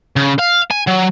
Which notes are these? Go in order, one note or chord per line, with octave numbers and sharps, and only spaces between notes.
C#3
F5
G#5
F#3